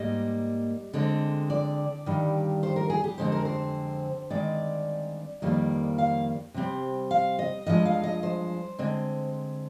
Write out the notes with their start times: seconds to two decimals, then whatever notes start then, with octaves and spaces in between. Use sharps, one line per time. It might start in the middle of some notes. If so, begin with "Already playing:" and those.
Already playing: G#2 G3 A#3 D#5
0.93 D3 G#3 C4
1.50 D5
2.06 G2 D#3 G3
2.63 C5
2.76 A#4
2.90 G#4
3.04 G4
3.18 F2 D3 G#3 C4 C5
3.32 A#4
3.45 C5
4.30 G2 D#3 G#3 C4 D5
5.42 F2 D#3 G3 A#3
5.98 F5
6.54 C3 G3 C4
7.11 F5
7.39 D#5
7.66 G2 F3 G#3 D#5
7.85 F5
8.04 D#5
8.23 C5
8.79 D3 G#3 C4